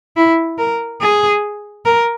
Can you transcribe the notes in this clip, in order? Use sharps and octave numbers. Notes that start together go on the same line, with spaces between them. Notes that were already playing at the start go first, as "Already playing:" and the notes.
E4
A#4
G#4
A#4